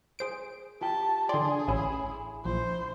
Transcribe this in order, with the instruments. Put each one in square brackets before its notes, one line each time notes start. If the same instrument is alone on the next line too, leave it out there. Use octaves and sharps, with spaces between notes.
[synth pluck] G#4 C5 D7
[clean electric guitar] F4 G4 G5 [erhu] A5
[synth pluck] D3 D5 [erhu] G#4 [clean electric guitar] C6
[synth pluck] A1 C#4 G#5 [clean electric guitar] E4
[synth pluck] A#1 [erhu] C5